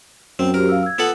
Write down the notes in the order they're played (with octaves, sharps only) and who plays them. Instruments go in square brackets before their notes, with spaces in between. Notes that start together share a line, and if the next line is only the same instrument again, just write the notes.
[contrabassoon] F#2 [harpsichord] C4
[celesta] F#4 G4 C5 [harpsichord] A#4
[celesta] F5 E6
E6 G#6
[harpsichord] B3 A4 F#5 [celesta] F4